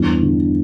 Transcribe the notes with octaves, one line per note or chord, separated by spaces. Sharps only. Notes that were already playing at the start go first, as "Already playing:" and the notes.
Already playing: E2 G2 E3
D3